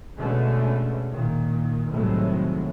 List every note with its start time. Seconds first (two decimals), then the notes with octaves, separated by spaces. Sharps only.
0.19 B2 D3 G#3 A3 C#4
1.11 A#2 D#3
1.91 C2 A2 D#3 F#3 G#3